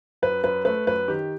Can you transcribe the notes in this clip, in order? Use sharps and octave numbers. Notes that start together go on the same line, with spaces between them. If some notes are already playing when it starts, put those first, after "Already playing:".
F#2 B4
F#2 B4
A3 B4
F#2 B4
D#3 G4